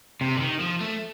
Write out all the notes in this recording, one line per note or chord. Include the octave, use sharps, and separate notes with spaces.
C3
D3
D#3
F3
A3